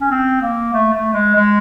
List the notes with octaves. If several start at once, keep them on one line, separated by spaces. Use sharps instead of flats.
C#4
C4
A#3
A3
A3
G#3
G#3